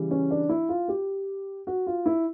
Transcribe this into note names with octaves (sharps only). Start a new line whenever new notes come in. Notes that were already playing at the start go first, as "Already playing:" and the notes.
Already playing: C#3 E3 G3
C#4
D4
E4
F4
G4
F#4
F4
E4